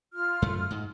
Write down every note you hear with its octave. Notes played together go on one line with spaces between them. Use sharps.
F4 F6
F#2 A3
G#2